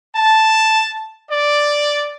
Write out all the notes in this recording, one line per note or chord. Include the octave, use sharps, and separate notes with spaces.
A5
D5